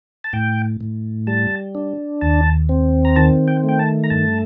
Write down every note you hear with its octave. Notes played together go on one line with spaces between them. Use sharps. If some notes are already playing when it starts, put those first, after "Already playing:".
A5
A2 G5
A2
G3 A5
D4
D#2 A5
C4
A#5
D#3 A5
G5
A3 G5
A5
A#5
G2 A5